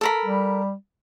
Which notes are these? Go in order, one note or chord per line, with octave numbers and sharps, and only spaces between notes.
A4 A#4 B5
G3